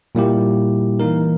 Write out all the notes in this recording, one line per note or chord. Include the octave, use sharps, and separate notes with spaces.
A#2 G3 A#3 E4 G4
E3 A#3 D#4 A#4